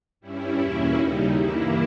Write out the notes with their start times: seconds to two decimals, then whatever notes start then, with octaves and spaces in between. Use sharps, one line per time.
0.20 G2 G3 C#4 E4
0.57 E2 B2 A#3 C#4
0.93 D#2 C#3 G3 D#4
1.29 G2 E3 A#3 E4